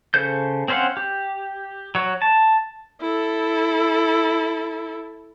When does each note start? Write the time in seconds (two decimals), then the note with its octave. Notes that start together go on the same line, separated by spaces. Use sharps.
0.14 C#3 A4 C5 G6
0.68 C4 C#4 C5 F5 F#5
0.97 G4
1.95 F#3 C#5
2.22 A5
3.01 E4 A4